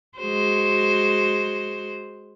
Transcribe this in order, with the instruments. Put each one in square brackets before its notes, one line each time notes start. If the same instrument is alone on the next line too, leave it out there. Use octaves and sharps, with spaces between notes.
[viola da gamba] G#3 F#4 C5